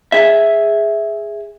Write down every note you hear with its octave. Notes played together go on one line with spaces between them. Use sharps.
G#4 E5